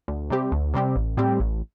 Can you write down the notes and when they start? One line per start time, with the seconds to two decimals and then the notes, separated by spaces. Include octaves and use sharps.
0.08 D2
0.30 C3 G3 C4 G4
0.52 D2
0.74 C3 G3 C4 G4
0.96 A1
1.17 A2 G3 C4 G4
1.40 A1